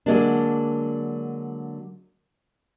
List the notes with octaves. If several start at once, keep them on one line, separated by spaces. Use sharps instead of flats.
D3 F#3 G#3 A#3 D4